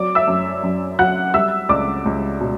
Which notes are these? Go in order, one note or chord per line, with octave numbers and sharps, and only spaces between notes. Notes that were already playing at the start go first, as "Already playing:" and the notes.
Already playing: F#3 D5 D6
E5 E6
F#2
F#2
F#3 F#5 F#6
G3 E5 E6
C#2 D5 D6
C#2
B2